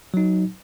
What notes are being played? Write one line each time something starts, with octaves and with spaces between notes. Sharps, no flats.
F#3 D#4